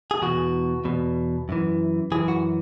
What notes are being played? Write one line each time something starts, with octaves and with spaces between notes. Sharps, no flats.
G#4
E2 B2 F#4
E2 B2
F#2 E3
F#2 E3 G#4
F#4